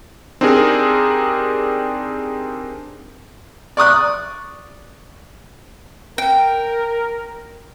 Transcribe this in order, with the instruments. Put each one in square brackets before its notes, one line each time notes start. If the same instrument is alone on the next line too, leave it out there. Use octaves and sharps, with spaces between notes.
[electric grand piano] C4 D4 D#4 G4 G#4 A#4
[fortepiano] D5 C#6 D#6 F#6
[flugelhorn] A#4 [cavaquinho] G5